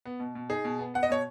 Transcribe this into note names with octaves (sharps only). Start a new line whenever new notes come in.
B3
B2
B2
D#4 G#4
B2
B3
B3 F#5
D#5
B2 C#5